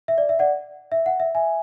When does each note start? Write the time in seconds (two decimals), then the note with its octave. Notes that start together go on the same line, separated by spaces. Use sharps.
0.08 E5
0.18 D5
0.29 E5
0.39 D5 F#5
0.92 E5
1.06 F#5
1.20 E5
1.35 E5 G#5